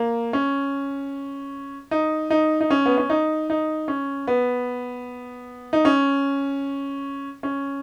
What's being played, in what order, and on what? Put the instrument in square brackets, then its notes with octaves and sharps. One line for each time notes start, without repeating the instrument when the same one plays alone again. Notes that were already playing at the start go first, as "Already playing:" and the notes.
Already playing: [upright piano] A#3
C#4
D#4
D#4
D#4
C#4
B3
C#4
D#4
D#4
C#4
B3
D#4
C#4
C#4